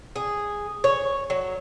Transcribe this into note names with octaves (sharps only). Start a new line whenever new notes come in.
G#4
C#5
F#3